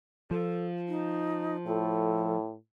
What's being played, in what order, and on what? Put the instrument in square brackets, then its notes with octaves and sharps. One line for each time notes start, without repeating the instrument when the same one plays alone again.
[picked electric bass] F3 [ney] A4
[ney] D#4
[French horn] A2 [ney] A4